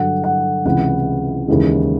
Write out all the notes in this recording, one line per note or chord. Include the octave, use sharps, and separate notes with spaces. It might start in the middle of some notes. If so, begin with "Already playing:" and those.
Already playing: G2 D3 F#3 F#5
F#5
C#2 C3 E3 G#3 F#5
D#2 C#3 E3 G#3